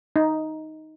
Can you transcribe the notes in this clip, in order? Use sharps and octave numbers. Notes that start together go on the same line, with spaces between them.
D#4